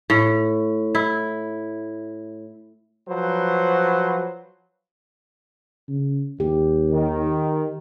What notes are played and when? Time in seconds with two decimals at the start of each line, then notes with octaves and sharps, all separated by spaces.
0.10 A2
0.95 E4
3.09 F3 F#3 B4 C5
5.88 C#3
6.40 D#2 G4
6.91 D#3